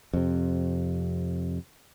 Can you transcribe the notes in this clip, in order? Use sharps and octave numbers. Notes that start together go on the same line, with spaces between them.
F2 C3